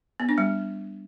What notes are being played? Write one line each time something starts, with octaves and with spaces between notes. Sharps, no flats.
B3
D4
G3